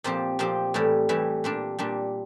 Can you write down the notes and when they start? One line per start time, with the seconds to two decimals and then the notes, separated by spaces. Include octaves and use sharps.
0.04 A#2 F3 C4 G4
0.39 A#2 F3 C4 G4
0.74 A2 E3 G3
1.09 A2 E3 G3
1.44 A#2 G3 D4
1.79 A#2 G3 D4